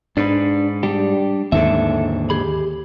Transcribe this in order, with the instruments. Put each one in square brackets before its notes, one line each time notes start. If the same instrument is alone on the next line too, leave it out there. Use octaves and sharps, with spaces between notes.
[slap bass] G#2 [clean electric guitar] D4 B4
[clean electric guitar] G3 D4 G4
[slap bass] D#2 G#2 D3 [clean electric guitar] A4 E5
[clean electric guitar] G4 G#4 B5